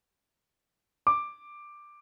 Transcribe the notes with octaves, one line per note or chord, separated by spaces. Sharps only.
D6